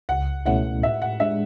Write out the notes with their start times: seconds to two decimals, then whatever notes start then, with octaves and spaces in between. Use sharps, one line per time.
0.09 C#2 F#5
0.45 B2 A3 C#4 E4 F#5
0.82 A2 E5
1.02 F#5
1.20 G#3 D4 E5